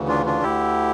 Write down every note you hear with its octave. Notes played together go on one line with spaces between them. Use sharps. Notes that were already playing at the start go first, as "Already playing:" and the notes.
Already playing: D2 C#3 E3
D4 F4
D4 F4
D2 D3 E4 G4